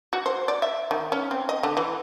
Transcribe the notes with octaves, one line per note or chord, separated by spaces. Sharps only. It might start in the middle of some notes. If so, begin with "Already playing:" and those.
F#4
C5
D5
E5
D#3
C#4
C4
D#5
D3
E3